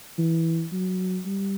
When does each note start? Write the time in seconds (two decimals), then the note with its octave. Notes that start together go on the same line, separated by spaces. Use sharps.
0.18 E3
0.72 F#3
1.26 G3